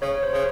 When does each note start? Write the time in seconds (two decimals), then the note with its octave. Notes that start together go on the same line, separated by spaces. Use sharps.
0.02 C#3 C#5
0.23 C5
0.33 C#3